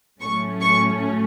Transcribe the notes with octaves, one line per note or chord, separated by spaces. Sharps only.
A2 F#3 A3 C#4 C#6
C#6